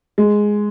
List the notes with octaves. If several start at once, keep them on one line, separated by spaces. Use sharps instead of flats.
G#3